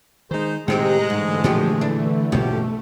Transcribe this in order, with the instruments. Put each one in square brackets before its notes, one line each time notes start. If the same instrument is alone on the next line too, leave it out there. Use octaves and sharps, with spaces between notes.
[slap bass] D#3 G#3 [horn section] D#4 G#4 C5
[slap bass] A2 C3 [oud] D#3 C4 G4 [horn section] G#3 [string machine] A#5 F#6
[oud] G#2 [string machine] D3 E3 A3
[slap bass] A#2 [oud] F3 F#4 G4
[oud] D4
[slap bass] A1 G2 A#3 [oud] B2 [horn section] F3 F#3 G4 [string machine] A3